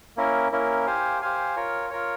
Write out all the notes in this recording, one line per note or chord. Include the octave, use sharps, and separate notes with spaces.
A#3 C#4 E4 A#4
A#3 C#4 E4 A#4
G4 C5 F5 G#5
G4 C5 F5 G#5
F4 A#4 C#5
F4 A#4 C#5